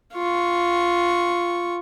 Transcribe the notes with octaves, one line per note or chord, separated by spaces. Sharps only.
F4 C#6